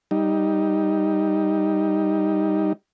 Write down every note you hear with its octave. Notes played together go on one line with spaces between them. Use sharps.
G3 D#4